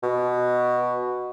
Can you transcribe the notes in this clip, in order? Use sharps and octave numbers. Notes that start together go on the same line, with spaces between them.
B2